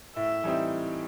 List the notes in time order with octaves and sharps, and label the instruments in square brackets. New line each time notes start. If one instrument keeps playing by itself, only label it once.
[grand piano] A2 [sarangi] E5
[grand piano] E3 G3 C4 D#4